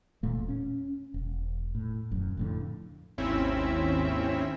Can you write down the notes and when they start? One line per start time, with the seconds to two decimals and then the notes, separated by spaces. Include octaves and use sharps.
0.23 E1 A#2 A3
0.48 C#4
1.14 E1
1.75 A2
2.11 D#1 F#2
2.37 F2 A2 D3
3.18 G#1 D#2 C4 C#4 E4 E5